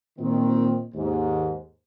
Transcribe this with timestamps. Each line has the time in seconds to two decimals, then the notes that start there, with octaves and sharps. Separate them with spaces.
0.19 A#2 D#3 C4
0.94 D#2 G#2